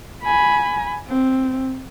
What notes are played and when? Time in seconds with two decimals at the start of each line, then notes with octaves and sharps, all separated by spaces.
0.23 G#5 B5
1.08 C4